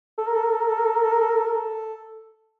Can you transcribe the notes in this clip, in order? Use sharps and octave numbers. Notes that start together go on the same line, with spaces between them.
A4
A#4
A4
A#4
A4
A#4
A4
A#4
A4
A#4
A4
A#4
A4
A#4
A4
A#4
A4